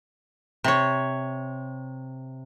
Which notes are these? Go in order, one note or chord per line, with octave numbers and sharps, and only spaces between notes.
C3 C#5